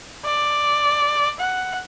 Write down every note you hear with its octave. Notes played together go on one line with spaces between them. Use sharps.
D5
F#5